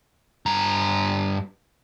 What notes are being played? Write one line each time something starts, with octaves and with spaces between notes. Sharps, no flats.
G2 A#5